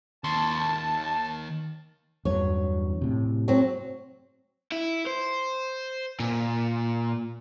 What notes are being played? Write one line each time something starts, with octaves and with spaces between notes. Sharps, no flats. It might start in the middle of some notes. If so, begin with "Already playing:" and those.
D#2 A5 C6
E2 G2 F#3 C#5
A2 C3
F#3 C4
E4
C5
A#2